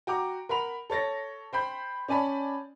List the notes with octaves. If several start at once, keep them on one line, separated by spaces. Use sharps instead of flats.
F#4 G5 A#5 D6
A#4 F#5 B5 F7
A4 C#5 A6 A#6
C5 G5 B5 G6
C#4 D5 G#5 A5 B5